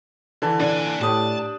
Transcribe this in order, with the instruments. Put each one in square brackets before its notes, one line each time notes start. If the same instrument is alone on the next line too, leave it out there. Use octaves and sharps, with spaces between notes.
[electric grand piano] D3 E3 A5
[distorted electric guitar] A#2 G#5 [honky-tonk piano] D4
[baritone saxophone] A2 [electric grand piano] G4 D#6 [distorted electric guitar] A5